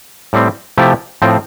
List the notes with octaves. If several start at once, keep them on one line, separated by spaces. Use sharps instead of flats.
A2 G3 C4
C3 F3 A3 E4 G4
A2 F3 C4